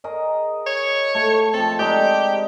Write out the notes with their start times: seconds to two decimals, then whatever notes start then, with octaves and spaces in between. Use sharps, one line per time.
0.04 G#4 A#4 D#5
0.67 C#5
1.15 A3 C#6
1.54 F3 C4 A4
1.79 G#3 D4 D#4 G4